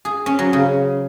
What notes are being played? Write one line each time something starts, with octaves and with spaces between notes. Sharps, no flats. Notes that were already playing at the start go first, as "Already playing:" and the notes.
G#4
C#4
F#3
C#3